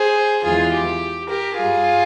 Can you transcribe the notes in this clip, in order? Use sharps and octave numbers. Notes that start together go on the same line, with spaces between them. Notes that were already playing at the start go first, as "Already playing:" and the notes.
Already playing: G#4 C5
E2 E3 G#3 F4 G#4
G4
G4 A#4
G2 G3 F4 G#4